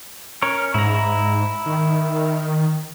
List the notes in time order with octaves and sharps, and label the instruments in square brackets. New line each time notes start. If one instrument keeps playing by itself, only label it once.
[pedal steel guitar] C#4 A#4 C#5
[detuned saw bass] G#2 [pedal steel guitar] E4 A#5
[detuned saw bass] D#3